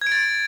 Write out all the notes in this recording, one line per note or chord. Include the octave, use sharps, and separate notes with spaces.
G#6
D7
A6